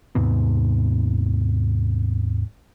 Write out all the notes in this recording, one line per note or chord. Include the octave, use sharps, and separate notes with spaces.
D#2 G#2 C3 B3